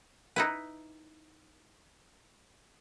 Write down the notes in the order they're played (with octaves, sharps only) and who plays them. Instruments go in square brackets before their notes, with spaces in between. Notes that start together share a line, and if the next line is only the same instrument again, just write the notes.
[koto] D#4 E4 B4